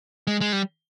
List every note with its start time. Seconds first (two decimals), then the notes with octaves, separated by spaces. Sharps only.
0.27 G#3
0.41 G#3
0.53 G3